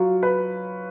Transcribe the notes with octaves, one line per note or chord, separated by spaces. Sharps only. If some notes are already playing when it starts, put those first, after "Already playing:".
Already playing: F#3 F4
B4